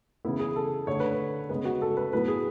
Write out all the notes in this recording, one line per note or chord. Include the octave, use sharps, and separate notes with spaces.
C#3 E3 B3 E4
G#4
A4
D3 A3 C#5
B4
C#5
C#3 G#3 B3 B4
F#4
A4
B4
A2 F#3 B3 B4
G#4